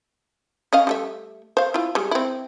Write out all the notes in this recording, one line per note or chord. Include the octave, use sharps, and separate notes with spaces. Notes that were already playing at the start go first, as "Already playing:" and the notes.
C#4 D#5 F5
G3 A3 E5
C5 F5
E4 F4
G3 G#3
C4 E4